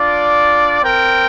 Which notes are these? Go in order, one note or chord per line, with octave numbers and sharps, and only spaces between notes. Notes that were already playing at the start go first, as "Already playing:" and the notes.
Already playing: D4 F4 D5
C4 A#4 G5